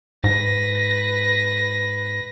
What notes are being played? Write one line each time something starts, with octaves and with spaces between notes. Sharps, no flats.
G#2 B4 A#6